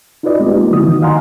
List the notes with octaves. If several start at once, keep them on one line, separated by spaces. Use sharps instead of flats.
D#4 F4 F#4 B4 D5 D#5
G#3 B3 C4 D#4 F4 G4
A#3 D#4
D3 F3 E4 F#4 D#6
D#3 E3 D#4
D#5 F5 F#5 G#5 A#5 C6